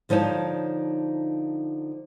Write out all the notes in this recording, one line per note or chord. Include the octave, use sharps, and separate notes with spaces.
D3 F3 D#4 C#5 A5